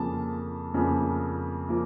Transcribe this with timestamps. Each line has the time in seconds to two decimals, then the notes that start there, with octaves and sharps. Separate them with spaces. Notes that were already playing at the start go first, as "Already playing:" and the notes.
Already playing: F2 C#3 F3 A#3 A5
0.74 F2 C#3 F3 A#3
1.69 F3 A#3